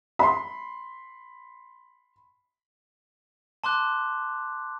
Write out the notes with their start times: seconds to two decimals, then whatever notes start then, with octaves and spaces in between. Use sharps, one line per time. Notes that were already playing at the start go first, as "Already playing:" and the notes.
0.19 B5 C6
3.64 A5 C6 D6 F#6